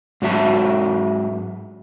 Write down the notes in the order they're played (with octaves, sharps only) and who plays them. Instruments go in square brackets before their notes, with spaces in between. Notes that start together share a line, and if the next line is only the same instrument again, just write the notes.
[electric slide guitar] G#2 F#3 F#4 E5 A5